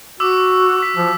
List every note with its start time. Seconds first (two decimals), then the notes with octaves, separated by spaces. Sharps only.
0.20 F#4 D6 E6
0.82 B6
0.96 F3